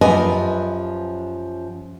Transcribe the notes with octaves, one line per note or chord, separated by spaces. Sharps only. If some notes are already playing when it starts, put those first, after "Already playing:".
F#2 F3 G4 B4 D#5 G#5